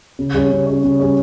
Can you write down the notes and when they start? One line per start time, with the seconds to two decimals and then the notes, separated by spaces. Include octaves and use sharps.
0.19 C#3
0.34 G3 C#4 G#4 C#5
0.51 C#3
0.66 G3 C#4 G#4 C#5
0.83 C#3
1.00 G3 C#4 G#4 C#5